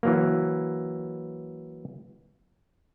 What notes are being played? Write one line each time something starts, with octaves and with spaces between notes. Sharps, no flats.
E3 F#3 A#3